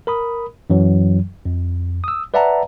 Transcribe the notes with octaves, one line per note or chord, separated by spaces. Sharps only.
A#4 B5 D#6
F#2 E3 F#3
F2
D#6 E6
B4 D5 E5 F#5 A5 A#5